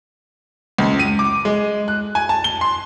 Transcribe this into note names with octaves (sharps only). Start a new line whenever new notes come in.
C#2
D#7
D6
G#3
F#6
G#5
A5
G7
C6